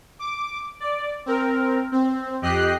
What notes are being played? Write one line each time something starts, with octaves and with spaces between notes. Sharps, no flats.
D6
D5
C4 A#4
C4
F2 G4 D#5 F#6 C7